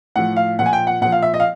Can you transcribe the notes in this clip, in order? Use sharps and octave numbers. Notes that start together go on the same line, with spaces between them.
A2 F3 F#5
F5
A#2 F3 F#5
G#5
G5
F#5
A#2 F3 F#5
F5
E5
D#5
F5